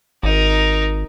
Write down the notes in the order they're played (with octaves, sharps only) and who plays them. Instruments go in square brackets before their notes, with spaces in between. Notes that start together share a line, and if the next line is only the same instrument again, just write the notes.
[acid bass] G#1 [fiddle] D#4 A#4